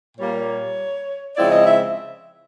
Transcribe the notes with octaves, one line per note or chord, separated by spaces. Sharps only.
A#2 G3 A#3 C#5
C#3 F3 G#3 C4 E4 D5
D#5
E5